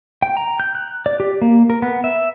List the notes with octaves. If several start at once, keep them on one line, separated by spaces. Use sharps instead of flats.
G5
A#5
G6
F#6
D5
G4
A#3
A#4
B3
E5